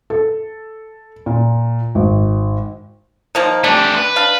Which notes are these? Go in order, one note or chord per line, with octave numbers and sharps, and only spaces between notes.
A4
A#2
G#1
D#3 F3 A#3
A3 D4 G4
B4
D4 F5